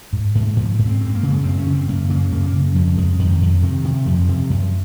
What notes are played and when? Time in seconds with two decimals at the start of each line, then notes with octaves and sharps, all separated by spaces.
0.13 G#2
0.35 G#2
0.56 G#2 F3
0.79 G#2
0.86 C4
1.00 F#2 C4
1.15 A#3
1.23 C#3
1.30 G#3
1.44 F#2 C4
1.58 C#4
1.66 C#3
1.74 C4
1.88 F#2 A#3
2.09 C#3 A#3
2.32 F#2 A#3
2.46 A#3
2.53 C#3
2.75 F2 F3
2.97 F2 G#3
3.19 F2 D#3
3.42 F2
3.63 C3 D#3
3.85 C3
4.06 F2 F3
4.28 C3
4.50 F#2